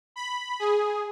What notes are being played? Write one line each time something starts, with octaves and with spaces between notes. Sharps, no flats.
B5
G#4